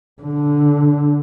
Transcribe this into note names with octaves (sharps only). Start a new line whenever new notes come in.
D3